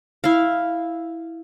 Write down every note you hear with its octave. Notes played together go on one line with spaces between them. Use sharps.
E4 F5